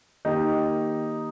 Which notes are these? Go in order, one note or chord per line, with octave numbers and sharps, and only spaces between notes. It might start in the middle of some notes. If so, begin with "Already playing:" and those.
D#3 A#3 D#4 G4